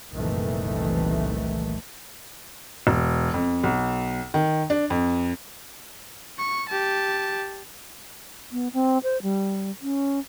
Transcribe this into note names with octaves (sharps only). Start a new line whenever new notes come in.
F#1 C2 A#2 D#3 E3 A3
E1
F2
B1
D#3
D4
F2
C#6
G4 A5
B3
C4
C5
G3
C#4